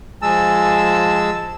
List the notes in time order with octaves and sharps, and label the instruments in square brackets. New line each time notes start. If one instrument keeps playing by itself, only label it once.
[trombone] F3 [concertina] G#3 E6 [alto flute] G#5 [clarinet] A5